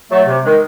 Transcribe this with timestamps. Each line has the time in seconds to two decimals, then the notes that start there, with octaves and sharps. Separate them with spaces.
0.10 F#3 A3
0.28 C3
0.45 D#3 G#3